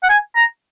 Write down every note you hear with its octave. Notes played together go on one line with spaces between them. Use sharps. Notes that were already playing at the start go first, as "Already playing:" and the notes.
F#5
G#5
A#5